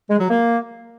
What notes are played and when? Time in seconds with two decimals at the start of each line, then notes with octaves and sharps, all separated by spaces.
0.09 G#3
0.19 F#3
0.30 A#3